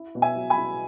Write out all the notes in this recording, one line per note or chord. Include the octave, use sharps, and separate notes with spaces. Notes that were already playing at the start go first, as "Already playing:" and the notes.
Already playing: E4
B2
E5 G#5
F#3
G#5 B5
E4